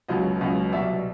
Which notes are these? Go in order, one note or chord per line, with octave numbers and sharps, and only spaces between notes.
C#2 B2 F#3 D#5
C#2 B2 F#3 D#5
C2 B2 F#3 D5 E5